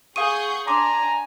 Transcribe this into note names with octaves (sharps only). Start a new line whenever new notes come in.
G#4 F5 F#5 C#6 D#6 G6 D#7
D4 G#5 A#5 C6 D6